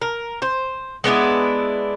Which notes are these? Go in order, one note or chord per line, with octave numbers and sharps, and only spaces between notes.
A#4
C5
G#3 B3 D4 E4